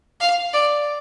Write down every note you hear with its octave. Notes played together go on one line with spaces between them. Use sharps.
F5
D5